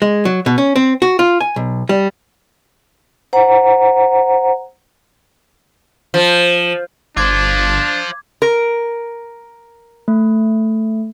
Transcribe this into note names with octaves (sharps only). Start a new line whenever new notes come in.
G#3
F#3
B2
C#4
C4
F#4
F4
G#5
B1
G3
C5 F#5 A#5
F3
G1 D4 F4 C5 D6 G#6
A#4
A3